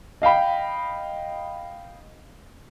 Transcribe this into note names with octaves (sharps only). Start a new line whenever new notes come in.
D#5 F5 G5 B5